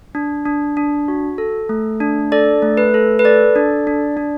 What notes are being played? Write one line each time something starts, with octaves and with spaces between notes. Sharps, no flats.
D4
D4
D4
F#4
A4
A3
D4
A4 D5
A3
B4
A4
B4
A4 D5
D4
D4
D4